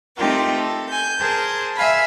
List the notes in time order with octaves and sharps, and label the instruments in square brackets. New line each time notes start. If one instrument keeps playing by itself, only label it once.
[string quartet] A3 C4 D#4 F4 G4 A#4
A4
G#5 G6
G#4 A#4 C5 A5
E5 F5 G#5 B5